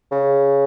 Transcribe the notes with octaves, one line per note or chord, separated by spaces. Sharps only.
C#3